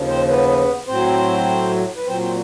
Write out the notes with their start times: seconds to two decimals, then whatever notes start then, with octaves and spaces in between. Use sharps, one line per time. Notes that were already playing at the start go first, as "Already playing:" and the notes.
Already playing: D#2 C#3 F3
0.08 C4 C5
0.28 B3 B4
0.88 A2 F#3 C4 C5
1.96 B4
2.07 A#2 F#3 C4 C5
2.22 C4 C5